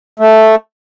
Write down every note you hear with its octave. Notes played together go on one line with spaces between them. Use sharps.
A3